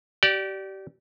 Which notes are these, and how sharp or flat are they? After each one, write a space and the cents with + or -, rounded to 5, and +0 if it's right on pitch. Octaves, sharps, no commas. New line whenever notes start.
G4 -30 D5 +0